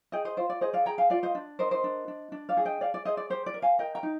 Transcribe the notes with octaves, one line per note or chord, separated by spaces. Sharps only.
G#4 D#5 G5
C5 D#5
F4 C5
D5
G#4 C5 D#5
D5 F5
G#4 G5 A#5
F5 G#5
F4 D5 F5
C5 D#5
D4
A#4 C5 D#5
C5 D#5
D4
D4
D4
D5 F5
G#4
D#5 G5
G#4 D5 F5
D5
G#4 C5 D#5
D5
G4 C5
D5
A#4
F5 G#5
A#4 D#5 G5
G5 A#5
D#4